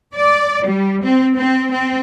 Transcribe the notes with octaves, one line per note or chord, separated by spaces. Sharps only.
D5
G3
C4
C4
C4